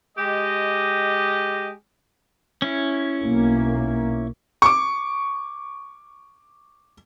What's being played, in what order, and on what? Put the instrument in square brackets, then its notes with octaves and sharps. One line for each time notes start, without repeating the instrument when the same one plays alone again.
[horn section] G#3 G4 D#5
[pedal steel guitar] C#4 E4
[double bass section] B1 A#3
[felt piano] C#6 D6